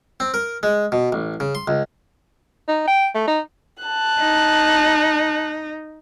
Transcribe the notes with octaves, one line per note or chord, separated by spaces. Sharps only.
C4
A#4
G#3
B2
A1
C#3
C6
C#2
D#4
G5
A3
D#4
A5 F#6
D#4